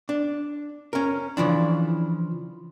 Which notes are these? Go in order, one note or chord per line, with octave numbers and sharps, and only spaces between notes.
D4
C#4 A#4
C#3 E3 F3 D4